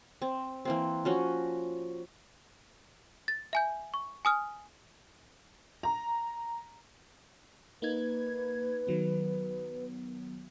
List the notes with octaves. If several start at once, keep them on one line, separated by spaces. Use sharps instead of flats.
C4
E3 A#3 C4
F3 C#4 F#4
A6
E5 G#5 G6
C#6
G#5 D#6 F6
A#5
A#3 D#4 B4 G#6
D#3 F#3 B3